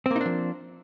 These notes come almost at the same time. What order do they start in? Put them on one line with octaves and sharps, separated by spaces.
C4 A#3 D#4 D4 F3